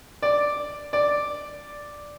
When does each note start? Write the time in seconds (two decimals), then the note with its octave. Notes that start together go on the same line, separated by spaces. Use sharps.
0.22 D5
0.93 D5